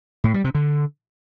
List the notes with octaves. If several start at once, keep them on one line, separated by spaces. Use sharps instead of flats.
A2
G3
C3
D3